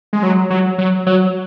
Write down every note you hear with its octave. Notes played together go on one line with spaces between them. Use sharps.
G#3
F#3
F#3
F#3
F#3